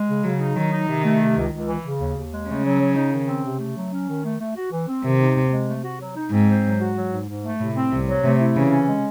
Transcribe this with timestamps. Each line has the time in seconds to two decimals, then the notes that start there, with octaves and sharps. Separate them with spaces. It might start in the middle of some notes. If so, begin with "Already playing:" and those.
Already playing: G#3
0.08 C#3
0.24 C#3 F#3
0.40 D#4
0.56 D#3 F#3
0.71 D#4
0.87 C3 D#3
1.04 A3
1.21 C3
1.36 C#2
1.52 C#2
1.67 E3
1.85 C#3
2.00 D#2
2.16 D#2
2.31 G#3
2.48 C#3 A3
2.64 F#3
2.80 F#3
2.95 D#4
3.12 D#3
3.28 C4
3.44 C3
3.59 A3
3.76 F#3
3.93 C#4
4.08 D#3
4.24 A3
4.39 A3
4.56 F#4
4.71 E3
4.87 C4
5.04 C3 D#3
5.19 D#4
5.36 D#2
5.51 G#3
5.67 A3
5.84 F#4
6.00 F#3
6.16 D#4
6.31 G#2 C4
6.48 C5
6.64 F#3
6.80 F#4
6.95 F#3
7.13 G#2
7.28 G#2
7.44 A3
7.60 A2 C3
7.75 C4
7.91 C2 C3
8.08 F#3
8.24 C3 A3
8.40 E4
8.56 C#3 E3
8.71 C#4
8.88 G#3